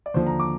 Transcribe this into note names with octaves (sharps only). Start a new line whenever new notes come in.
D5
D#2 D3 F3 C5
A#5
D6